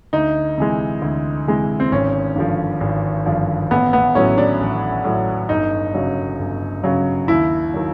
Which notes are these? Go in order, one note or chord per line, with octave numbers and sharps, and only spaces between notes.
D2 D#4
C3 E3 G#3
D2
C3 E3 G#3
C4
G#1 C#4
G2 D3 F3
G#1
G2 D3 F3
A1 B3
B3
A2 F#3 C#4
D4
A1
A2 F#3
G1 D#4
F#2 C#3 F#3
G1
F#2 C#3 F#3
D#2 E4
D#3 F#3